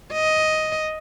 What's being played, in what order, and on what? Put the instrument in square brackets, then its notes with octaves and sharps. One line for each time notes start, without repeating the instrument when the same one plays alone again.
[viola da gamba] D#5